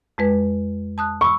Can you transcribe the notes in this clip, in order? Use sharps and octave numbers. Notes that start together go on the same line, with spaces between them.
F2 G#3 B4
A5 D#6 F#6
B5 C#6 E6